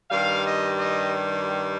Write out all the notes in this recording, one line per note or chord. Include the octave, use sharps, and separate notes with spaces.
G2 D#3 G3 F5
D#5
D#5